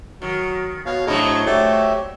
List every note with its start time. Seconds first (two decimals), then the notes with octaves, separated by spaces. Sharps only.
0.22 D#3 F#3
0.86 B2 C#5 F5
1.07 A2 F#3 C4 D4 G#4 D#5 A#5
1.46 A3 F#4 G4 C#5 D5 E5